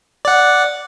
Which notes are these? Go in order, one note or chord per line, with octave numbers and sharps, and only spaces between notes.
D5 F#5